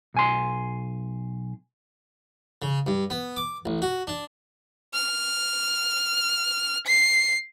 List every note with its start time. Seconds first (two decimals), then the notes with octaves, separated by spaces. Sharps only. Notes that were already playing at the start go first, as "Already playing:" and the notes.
0.14 B1 G#5 C6
2.62 C#3
2.87 G2
3.10 B3
3.37 D6
3.66 A1
3.82 F#4
4.07 D4
4.93 F6
6.86 C7